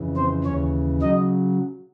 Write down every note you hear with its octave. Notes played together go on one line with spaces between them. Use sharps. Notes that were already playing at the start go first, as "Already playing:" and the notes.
Already playing: F2 C#3 E3
C4 C5
D#2 C#3 E3 C#4 C#5
C#3 F#3 D#4 D#5